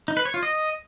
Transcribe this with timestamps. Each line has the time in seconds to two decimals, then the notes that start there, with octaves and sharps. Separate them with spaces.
0.08 D#4
0.17 B4
0.25 C#5
0.34 F4
0.43 D#5